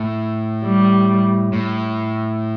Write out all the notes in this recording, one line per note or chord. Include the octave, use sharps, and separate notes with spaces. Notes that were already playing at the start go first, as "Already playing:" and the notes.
Already playing: A2
G3
A2